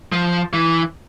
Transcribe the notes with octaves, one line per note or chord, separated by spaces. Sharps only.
F3
E3